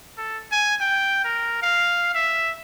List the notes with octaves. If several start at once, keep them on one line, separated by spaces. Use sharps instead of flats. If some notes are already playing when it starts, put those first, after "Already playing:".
A4
G#5
G5
A#4
F5
E5